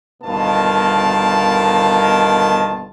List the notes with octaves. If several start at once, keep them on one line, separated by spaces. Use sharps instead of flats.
G1 B2 D#3 A#3 F4 A5